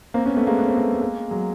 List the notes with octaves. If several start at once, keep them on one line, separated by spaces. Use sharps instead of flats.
A#3 C4
B3 C#4
A3 B3
G#3 A#3
B3
C4
A3 B3
A3
G#3 A#3
F#3 G#3